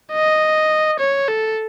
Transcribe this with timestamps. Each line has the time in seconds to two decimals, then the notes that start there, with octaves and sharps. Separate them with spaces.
0.12 D#5
1.00 C#5
1.28 A4